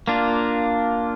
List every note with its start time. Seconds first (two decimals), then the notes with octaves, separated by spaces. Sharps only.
0.07 A#3 D4 F4